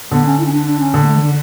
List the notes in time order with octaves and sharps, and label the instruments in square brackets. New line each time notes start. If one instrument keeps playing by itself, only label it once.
[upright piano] D3 [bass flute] B3
[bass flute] C#4
E4
C#4
D4
D4
C#4
[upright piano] D3
[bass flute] B3
A3
E3
D3